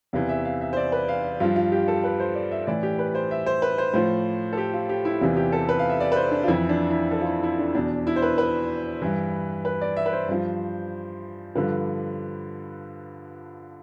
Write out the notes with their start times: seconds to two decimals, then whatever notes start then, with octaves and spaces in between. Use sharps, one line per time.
0.13 E2 C3 E3 F5
0.29 E5
0.45 F5
0.61 E5
0.73 C5
0.77 D5
0.92 B4
1.08 F5
1.40 G2 F3 F4
1.56 F4
1.72 G4
1.88 A4
2.04 B4
2.20 C5
2.35 D5
2.51 E5
2.67 A2 E3 D5
2.83 G4
2.99 B4
3.15 C5
3.31 E5
3.46 C5
3.62 B4
3.78 C5
3.94 A2 F3 C5
4.53 A4
4.57 G4
4.73 F4
4.89 G4
5.05 E4
5.21 E2 C3 E3 F4
5.37 G4
5.52 A4
5.69 B4
5.79 F5
5.90 E5
6.00 D5
6.12 B4
6.16 C5
6.31 D4
6.43 F4
6.48 F2 E3 E4
6.69 D4
6.90 E4
7.11 A4
7.21 F4
7.27 E4
7.43 E4
7.59 D4
7.75 E2 B2 D4
8.07 E4
8.16 C5
8.22 B4
8.38 B4
9.02 G2 E3
9.65 B4
9.81 D5
9.96 E5
10.06 B4
10.13 C5
10.28 G2 F3
11.55 G2 D3 F3 B4